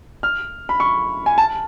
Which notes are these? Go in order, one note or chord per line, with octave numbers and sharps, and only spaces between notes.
F6
B5
C#6
G#5
A5